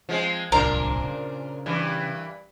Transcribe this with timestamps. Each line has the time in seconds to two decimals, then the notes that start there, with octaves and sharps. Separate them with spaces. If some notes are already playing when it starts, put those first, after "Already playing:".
0.09 F3 G#3 C4
0.52 D1 C2 A#2 D4 A#4 C5
1.04 C#3
1.66 G2 E3